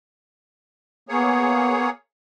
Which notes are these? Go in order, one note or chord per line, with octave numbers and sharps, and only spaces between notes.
A#3 B3 G#4 C#5